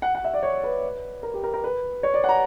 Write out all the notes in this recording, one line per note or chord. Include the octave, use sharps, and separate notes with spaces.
F#5
F#5
E5
D5
C#5
B4
A#4
G4
A#4
A#4
B4
C#5
D5
F#5
A#5